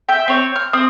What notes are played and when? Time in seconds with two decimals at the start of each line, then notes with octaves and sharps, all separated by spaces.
0.09 E5 G5
0.28 C4 C#5
0.56 F6
0.73 C4 D#6